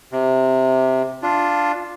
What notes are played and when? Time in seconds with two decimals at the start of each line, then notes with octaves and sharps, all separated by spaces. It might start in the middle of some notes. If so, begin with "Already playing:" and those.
0.12 C3
1.23 D4 F4